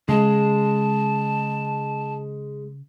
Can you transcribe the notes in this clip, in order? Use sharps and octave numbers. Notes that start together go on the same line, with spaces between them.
C#3 G#3 A5